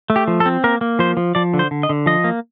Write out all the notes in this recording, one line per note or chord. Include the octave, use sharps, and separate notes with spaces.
A3
G4
F3
A4
C4
A#3 A#4
A#3
F3 C5
F3
F3 D5
D3
C5
D3
D#5
D3
F3 D#5
A#3